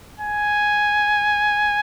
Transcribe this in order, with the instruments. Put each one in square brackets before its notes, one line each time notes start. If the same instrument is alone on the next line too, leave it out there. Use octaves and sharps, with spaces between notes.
[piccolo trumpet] G#5